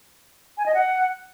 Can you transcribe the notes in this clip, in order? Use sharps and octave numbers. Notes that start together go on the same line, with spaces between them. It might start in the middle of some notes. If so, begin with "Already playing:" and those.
G#5
D#5
F#5